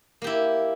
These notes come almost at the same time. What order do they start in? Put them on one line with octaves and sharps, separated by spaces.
A#3 G4 E4